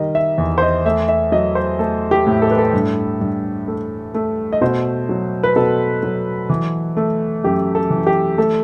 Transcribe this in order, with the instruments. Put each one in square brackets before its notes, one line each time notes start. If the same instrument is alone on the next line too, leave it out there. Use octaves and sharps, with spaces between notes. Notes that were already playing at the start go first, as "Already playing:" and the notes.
Already playing: [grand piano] D#3 G3 D#5
E5
E2
C5
D#5
A3 E5
E5
F#3 D#5
C5
A3 A4
G4
A2
A4
B4
A4
G2
G2
A3
A3
D#5
B2 C5
F#3
B4
B2 A4
F#3
E3
A3
F#2 G4
A4
E3
G4
A3 A4